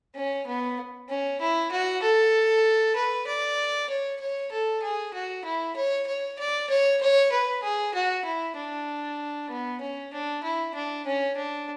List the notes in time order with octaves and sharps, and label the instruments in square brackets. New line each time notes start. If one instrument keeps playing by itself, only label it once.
[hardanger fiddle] C#4
B3
C#4
E4
F#4
A4
B4
D5
C#5
C#5
A4
G#4
F#4
E4
C#5
C#5
D5
C#5
C#5
B4
G#4
F#4
E4
D4
B3
C#4
D4
E4
D4
C#4
D4